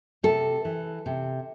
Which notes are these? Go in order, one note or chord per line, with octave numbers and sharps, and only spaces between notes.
C3 A4
E3
C3